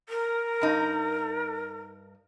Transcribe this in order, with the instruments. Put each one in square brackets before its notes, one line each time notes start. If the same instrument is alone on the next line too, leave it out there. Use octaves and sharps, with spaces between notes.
[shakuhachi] A#4
[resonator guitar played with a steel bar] G2 D#4